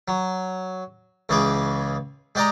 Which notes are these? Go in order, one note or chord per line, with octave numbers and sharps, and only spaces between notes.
F#3
C#2 C#3 E3 G#4 D6
G#3 G4 D5 D#5 A#5